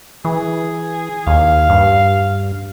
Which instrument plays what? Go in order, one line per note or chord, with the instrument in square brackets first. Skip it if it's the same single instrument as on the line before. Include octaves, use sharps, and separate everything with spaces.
[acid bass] E3 [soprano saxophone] G#4
[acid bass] D#2 [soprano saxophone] F5
[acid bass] G2